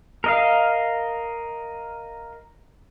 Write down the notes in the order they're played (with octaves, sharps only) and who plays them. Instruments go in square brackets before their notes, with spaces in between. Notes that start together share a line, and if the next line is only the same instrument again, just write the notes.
[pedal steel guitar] A#4 D#5 F5